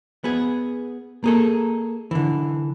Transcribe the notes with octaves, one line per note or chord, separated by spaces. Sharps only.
B3 G#4
A#3 G#4 A4
D3 E3